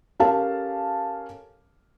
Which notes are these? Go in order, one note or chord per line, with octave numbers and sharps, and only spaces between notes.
C#4 G4 A4 A#4 F5 A5